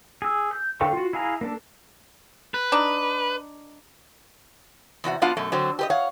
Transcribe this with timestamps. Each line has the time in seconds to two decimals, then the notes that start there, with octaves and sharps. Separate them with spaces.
0.22 G#4 E6
0.53 G6
0.81 D3 A4 F5 G5 C#6
0.93 F4 F#4
1.13 E4 G#4 F5 G#5 A#5
1.41 A#3 D4 A4
2.54 B4
2.72 D4 D#4
5.04 E2 C3 F#4 F#5
5.22 F#3 B3 D4 F4 F5 F#5
5.37 F#2 B2 A3
5.52 D3 F#3 C4
5.79 G4 B4 D#5
5.90 C#5 F5 F#5